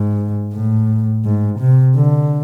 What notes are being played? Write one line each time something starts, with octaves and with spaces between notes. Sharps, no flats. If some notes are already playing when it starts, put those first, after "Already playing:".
Already playing: G#2
A2
G#2
C3
D3